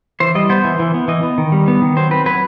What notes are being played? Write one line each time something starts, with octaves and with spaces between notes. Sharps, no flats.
E3 C5
G3 D#5
B3 C5
E3
E3
B3
E3 D#5
B3
D#3
G3
B3
D#3
F#3 C5
C4 B4
F#3 B4